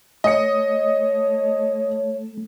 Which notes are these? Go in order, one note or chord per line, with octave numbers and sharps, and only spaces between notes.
A3 C#5 D#5 C#7